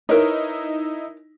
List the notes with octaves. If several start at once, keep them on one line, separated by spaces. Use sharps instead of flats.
D#4 E4 A#4 B4 C#5